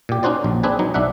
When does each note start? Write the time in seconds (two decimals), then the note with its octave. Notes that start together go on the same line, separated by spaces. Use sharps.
0.09 A#2 G4
0.23 C#4 D#4 F#4 C5 D5
0.44 A#1
0.63 C4 D4 G#4 B4 G#5
0.79 F#3 D#4
0.94 B1 D4 E5 F#5